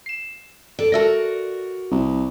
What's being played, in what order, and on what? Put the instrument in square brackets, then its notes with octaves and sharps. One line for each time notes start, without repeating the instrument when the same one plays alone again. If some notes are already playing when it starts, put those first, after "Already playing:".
[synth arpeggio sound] C7 E7
[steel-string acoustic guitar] A4 D5
[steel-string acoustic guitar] F#4 A#4 D5 [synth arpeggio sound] A4 E5 A#6
[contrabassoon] C2